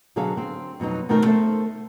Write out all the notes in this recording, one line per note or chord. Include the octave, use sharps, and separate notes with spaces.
B2 D3 F#3 G#4 A4 F5
C4
F2 B2 F#3 D#4
B2 D#3 A3 C4 D#4 A#4
A3 A4 C5 E5